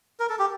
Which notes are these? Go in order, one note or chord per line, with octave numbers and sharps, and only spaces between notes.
A#4
A4
G4